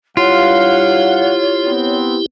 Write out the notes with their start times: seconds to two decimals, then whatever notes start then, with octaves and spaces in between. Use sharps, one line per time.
0.17 G2 E4 F4 G4 C#5 F5 F#5
1.65 B3 C4